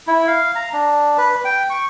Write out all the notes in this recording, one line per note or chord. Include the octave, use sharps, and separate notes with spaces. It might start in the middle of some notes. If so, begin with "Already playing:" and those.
E4
F5
A#5
D4
B4
G5
C#6